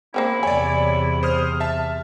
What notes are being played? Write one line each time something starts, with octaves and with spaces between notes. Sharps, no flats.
A#3 C4 C#4 E4
E2 C3 C#5 D5 G#5
C5 D#6 F6
E5 A5